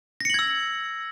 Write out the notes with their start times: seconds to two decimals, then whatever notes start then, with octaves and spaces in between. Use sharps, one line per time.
0.20 A#6
0.25 C#7
0.30 F#7
0.34 G#6
0.39 E6